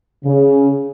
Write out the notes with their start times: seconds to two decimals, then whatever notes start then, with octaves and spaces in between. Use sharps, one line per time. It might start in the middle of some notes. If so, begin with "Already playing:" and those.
0.25 C#3